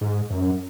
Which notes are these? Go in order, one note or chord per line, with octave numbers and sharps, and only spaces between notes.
G#2
F#2